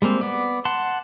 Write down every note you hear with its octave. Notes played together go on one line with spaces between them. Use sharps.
G3 G#3 A#3 C4
B3 D5
F#5 A5 C6